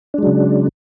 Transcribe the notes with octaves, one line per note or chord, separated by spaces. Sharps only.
C#3 F#3 G#3 D4